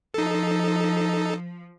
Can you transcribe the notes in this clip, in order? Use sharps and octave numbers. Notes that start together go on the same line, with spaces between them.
F3 D#4 A4